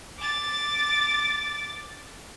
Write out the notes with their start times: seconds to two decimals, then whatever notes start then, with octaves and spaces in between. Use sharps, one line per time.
0.19 D6 A6